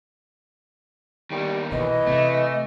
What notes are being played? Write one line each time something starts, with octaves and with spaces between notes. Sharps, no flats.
D#3 G3 A#3 B3
B2 E3 D#5
C3 A3